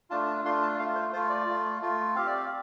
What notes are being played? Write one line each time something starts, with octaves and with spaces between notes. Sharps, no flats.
A3 D4 F4 A5
A5
A3 D4 F4 C6
A5
A3 F4 F5
C5
A3 F4 C5
D5
A3 F4
A3 F4
C4 G4 F5
D5
F5